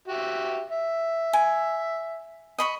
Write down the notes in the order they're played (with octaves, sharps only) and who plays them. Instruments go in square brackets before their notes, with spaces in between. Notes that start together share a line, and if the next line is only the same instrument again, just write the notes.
[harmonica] F#4 G4 E5
E5
[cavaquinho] G#5
D#5 B5 C#6